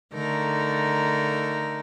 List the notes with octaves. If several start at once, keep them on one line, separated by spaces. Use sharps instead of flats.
D3 A3 D#4 A#4